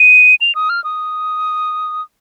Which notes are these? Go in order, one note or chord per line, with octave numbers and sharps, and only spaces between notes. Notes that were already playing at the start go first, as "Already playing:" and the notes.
Already playing: D#7
F7
D#6
F6
D#6